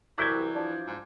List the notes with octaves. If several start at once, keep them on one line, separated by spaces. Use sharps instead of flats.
C2 E3 F#3 E4 D6 G6 G#6
F3 D4
G#2